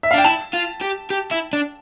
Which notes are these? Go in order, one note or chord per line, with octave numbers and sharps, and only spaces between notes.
E5
F5
D4 G5
E4 A5
F4
G4
G4
E4
D4